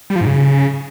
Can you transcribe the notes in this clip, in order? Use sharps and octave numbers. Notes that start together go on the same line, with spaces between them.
G3
F3
G#2
C#3